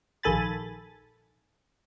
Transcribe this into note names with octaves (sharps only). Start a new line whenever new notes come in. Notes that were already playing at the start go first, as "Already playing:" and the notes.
A#1 D#3 A4 G#5 B5 A6